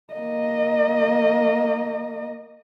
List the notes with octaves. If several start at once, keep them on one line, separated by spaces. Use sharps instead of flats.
A#3 D#5